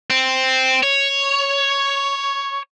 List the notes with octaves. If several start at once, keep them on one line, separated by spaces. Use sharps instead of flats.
C4
C#5